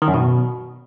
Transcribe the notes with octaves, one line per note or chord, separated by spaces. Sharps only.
D#3
F#2
B2